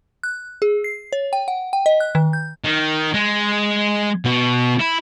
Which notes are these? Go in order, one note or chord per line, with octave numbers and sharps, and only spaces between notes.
F#6
G#4
C7
C#5
G5
F#5
G5
D#5
F#6
D#3
G6
D#3
G#3
B2
E4